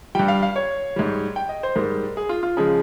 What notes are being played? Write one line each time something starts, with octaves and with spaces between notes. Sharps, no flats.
G2 G3 G5
F5
F5
C#5
G#2 G3
G5
D#5
C5
G#2 G3 A#4
G#4
F4
F4
C#3 F3 G#3 G#4